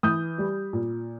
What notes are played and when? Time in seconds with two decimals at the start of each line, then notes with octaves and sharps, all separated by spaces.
0.03 E3 D#6 G6
0.38 G3
0.73 A#2